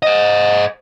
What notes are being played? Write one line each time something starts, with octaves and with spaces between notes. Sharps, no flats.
C5 D#5